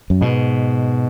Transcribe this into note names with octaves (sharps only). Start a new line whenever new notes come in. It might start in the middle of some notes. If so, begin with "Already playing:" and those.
F#2
G#2 B2